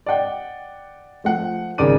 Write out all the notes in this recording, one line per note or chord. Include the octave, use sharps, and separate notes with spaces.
D5 D#5 F#5 G5
F3 A3 F#5
G#1 C#3 A#4 D5 D6 D#7